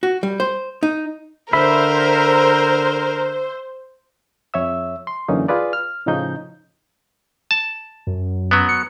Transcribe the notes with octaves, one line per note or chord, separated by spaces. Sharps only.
F#4
G3
C5
D#4
D3 A#4 C5 E5 B5
F2 C#5 E5 E6
C6
F#2 D3 E3 A#3 C#4 D#4
F4 G#4 B4 D5
F6
A2 C#3 F3 C#4 D#4 G6
A5
F#2
F#3 B3
C#7